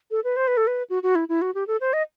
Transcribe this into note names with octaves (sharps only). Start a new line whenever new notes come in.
A4
B4
C5
B4
A4
B4
F#4
F#4
E4
E4
F#4
G4
A4
C5
D#5